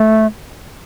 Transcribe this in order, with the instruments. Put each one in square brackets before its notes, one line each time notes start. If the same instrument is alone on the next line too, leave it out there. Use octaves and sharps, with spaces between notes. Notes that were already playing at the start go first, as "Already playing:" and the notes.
Already playing: [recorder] A3